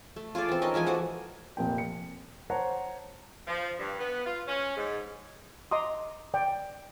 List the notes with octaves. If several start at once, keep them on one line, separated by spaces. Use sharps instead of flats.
A3
F4 G#4 A4 D5
E3 C4
C#4 D#4 A#4 D#5
E3 F3 G#3 G#5
F#4 A4 D5 F#5
F1 A#2 G5
C#7
C5 C#5 F#5 A5 A#5
F3
G2
B3
F4
C#4
G#2
D#5 A#5 C6 D6 D#6
D5 G5